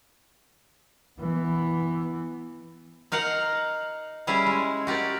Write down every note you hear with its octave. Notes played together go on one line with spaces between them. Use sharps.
E3 B3
D#4 A#4 F5 F#5
G3 C#4 E4 G#4
G#3
F#4 G4 A#4 D5